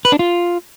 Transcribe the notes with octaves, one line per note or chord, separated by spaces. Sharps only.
B4
D4
F4